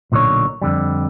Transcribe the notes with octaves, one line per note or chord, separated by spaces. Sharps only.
B1 A#2 D3 D#4 C#5
F2 D3 G3